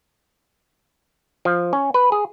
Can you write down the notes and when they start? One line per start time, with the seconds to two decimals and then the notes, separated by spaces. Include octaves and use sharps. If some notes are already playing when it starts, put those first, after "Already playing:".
1.45 F3
1.73 C#4
1.94 B4
2.12 G#4